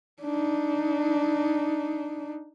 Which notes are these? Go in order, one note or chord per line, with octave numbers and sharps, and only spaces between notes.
D4 D#4